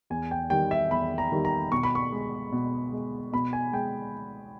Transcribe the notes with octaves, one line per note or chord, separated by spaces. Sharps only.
E2 G#5
G5
D#3 G3 G5
E5
E2 B5
A#5
D#3 G3
A#5
B2 C#6
B5
C#6
G#3
B2
G#3
B2 B5
G#5
G#3 G5